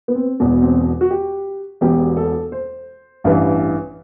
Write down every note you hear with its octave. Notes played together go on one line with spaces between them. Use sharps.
B3
C4
E1 E2 B2
C4
F#4
G4
E1 E2 B2 G4
A4
C5
A1 G2 E3